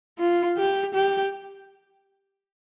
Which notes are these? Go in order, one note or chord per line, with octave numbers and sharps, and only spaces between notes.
F4
G4
G4